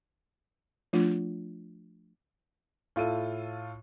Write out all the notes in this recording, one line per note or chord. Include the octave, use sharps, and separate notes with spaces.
F3 A3 D4 F4
A2 F4 A4 D#7